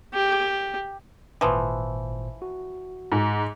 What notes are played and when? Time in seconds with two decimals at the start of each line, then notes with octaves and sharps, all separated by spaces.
0.14 G4
1.41 G#1 A#2 E3 F3 C5
2.42 F#4
3.12 G#2